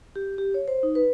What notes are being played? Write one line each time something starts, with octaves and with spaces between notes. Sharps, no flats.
G4
G4
C#5
C5
D#4
B4